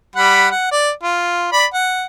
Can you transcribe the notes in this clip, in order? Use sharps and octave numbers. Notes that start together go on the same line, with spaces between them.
G3 F#5 B5
F#5
D5
F4
D5 B5
F#5